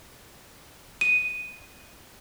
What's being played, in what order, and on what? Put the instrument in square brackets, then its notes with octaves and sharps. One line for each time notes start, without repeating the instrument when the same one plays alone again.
[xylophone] D#7